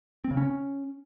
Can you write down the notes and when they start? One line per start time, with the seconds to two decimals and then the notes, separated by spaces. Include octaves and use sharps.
0.24 C4
0.31 C#3
0.37 C#4